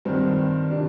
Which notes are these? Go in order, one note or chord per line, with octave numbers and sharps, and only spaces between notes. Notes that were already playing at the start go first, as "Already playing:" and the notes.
G2 D#3 C4
C3 D#3 D4